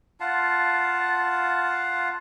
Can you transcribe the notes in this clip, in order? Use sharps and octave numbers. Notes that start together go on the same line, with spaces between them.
F4 F5 F#5 A5